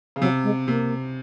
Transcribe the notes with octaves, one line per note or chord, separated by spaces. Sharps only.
C#3
C3 F#3
G#3
C3 A#3